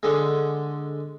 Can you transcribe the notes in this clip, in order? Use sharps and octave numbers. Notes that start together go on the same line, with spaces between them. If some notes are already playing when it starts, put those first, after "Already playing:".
D3 G#3